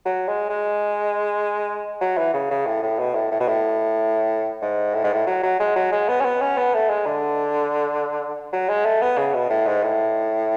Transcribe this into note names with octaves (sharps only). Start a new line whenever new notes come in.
F#3
G#3
G#3
F#3
E3
C#3
C#3
A2
A2
B2
A2
A2
B2
A2
G#2
A2
G#2
A2
F#3
F#3
G#3
F#3
G#3
B3
C#4
B3
C#4
B3
A3
G#3
D3
F#3
G#3
A3
B3
C#3
B2
A2
G#2
A2